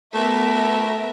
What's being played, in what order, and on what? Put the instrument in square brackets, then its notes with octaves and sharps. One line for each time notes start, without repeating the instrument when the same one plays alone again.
[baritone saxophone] A3 [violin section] B3 A#4 E5